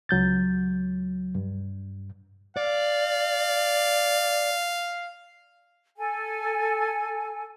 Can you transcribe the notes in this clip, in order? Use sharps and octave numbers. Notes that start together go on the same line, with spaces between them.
C#2 F#3 G6 A6
G2
D5 F5
A4 G#5